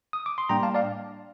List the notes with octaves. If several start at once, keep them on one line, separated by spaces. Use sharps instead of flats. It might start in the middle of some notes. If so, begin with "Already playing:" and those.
D#6
D6
C6
A2 G3 A#3 D4 G5 A#5
F5 A5
D5 F5